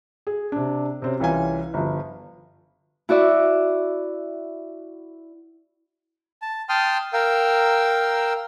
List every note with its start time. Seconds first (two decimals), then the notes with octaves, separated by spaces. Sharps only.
0.27 G#4
0.52 C3 D4
1.02 C3 C4 C#4
1.20 C2 E3 C#4 F4 G#5
1.74 G1 F3
3.09 E4 F#4 D5 E5
6.42 A5
6.69 G5 A5 C6 D#6 F6
7.13 A#4 F5 G5 E6